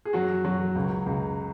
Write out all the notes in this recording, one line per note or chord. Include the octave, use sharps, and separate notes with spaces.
G#4
F#2 F#3 F#4
F#2 F#3 F#4
C#2
C#2